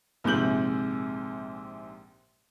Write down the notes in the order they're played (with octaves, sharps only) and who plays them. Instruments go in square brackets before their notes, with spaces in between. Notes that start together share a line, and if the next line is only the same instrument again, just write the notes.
[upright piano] A#1 G#2 C3 G6 F#7